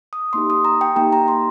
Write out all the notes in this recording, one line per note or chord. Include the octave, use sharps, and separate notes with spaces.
D#6
A#3 D#4 G4 C6
D#6
A#5
G5
A#3 D#4 G4 A#5
A#5
C6